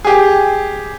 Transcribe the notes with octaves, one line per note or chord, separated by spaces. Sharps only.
G4 G#4